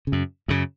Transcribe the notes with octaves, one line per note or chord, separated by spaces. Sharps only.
C#3
F#2
F#2 C#3